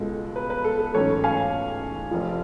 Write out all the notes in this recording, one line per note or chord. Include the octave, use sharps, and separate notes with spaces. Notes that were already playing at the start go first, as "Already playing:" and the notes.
Already playing: C#2 B2 G#3 A4
B4
B4
A4
A4
A1 G#2 F#3 C#4 A4 C#5
F5 G#5
F1 F2 F3